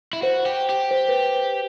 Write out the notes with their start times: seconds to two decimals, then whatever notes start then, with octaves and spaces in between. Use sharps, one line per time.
0.13 E4
0.22 F#4 C5
0.46 G4
0.69 G4
0.91 C5
1.08 B4